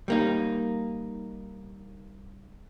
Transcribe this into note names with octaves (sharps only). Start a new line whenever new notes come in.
G3 A#3 D#4